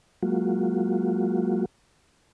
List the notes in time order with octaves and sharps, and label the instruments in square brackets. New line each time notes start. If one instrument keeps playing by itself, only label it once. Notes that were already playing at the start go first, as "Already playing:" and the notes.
[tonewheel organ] F#3 G#3 A#3 F4 F#4